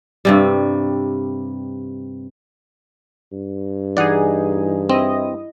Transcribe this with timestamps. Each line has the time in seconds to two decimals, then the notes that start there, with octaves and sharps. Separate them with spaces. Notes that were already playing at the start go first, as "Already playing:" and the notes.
0.25 G2 C3 G3
3.32 G2
3.97 E3 D#4 G#4 D5 F#5
4.89 C4 E4 D#5